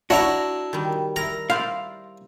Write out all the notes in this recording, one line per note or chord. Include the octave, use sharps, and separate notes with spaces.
D4 E4 F#4 C#5 A#5
D#3 G3
E4 A#4 A#5
E4 C5 D5 F5